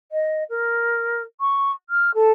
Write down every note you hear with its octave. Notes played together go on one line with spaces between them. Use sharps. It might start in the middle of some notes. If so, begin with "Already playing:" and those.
D#5
A#4
C#6
F6
A4